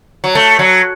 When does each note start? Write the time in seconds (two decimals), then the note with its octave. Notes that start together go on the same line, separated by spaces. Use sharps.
0.24 F#3
0.35 A3
0.59 F#3